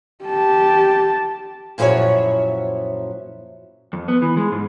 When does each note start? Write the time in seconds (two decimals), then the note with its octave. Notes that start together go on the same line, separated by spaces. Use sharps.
0.25 G4 A5
1.78 F#2 A#2 F3 E4 F#4 C#5
3.93 F2
4.08 B3
4.22 E3
4.37 G#3
4.52 G#2